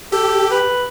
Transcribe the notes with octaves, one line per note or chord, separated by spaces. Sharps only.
G4 A4
B4